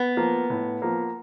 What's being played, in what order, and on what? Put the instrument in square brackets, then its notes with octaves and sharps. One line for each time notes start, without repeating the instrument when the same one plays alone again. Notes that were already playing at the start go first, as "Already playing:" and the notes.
Already playing: [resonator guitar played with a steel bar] B3
[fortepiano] F3 A#3
A2
F3 A#3